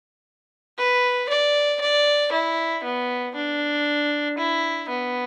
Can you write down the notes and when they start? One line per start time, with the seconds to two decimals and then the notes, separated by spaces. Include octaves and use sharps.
0.78 B4
1.29 D5
1.81 D5
2.32 E4
2.83 B3
3.35 D4
4.38 E4
4.89 B3